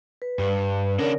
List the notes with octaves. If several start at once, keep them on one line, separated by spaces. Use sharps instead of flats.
B4
G2
C#3 D4 A#4 C#5 D5